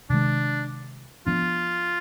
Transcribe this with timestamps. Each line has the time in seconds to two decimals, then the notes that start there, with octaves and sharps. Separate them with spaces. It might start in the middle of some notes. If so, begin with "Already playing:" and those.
0.10 C3 D#3 G#3 D4
1.27 F3 B3 D4 F4